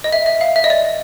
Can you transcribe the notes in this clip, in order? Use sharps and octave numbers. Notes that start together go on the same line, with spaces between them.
D#5
E5
E5
F5
E5
D#5
D5